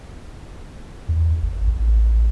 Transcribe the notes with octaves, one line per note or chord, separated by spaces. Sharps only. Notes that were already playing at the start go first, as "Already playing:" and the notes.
E2
G#1
A1